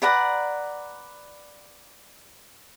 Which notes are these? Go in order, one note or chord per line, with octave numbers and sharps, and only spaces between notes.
B4 D5 F#5 A#5